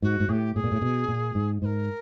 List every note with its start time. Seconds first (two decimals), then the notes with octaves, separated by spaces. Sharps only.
0.02 G#2 F#4
0.20 G#2
0.29 A2 G#4
0.33 G4
0.55 A2 G#4
0.64 A#2
0.72 A2
0.82 B2
1.08 A#2
1.35 G#2
1.62 G#2 A#4 C5